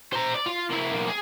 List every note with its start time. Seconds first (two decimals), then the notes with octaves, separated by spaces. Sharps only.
0.13 C5 A#5
0.34 D5
0.46 F4
0.70 A#3 E4
0.91 B1 A#3
1.08 G#4